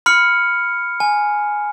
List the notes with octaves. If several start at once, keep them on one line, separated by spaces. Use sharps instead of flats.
B5 F6 C#7
G#5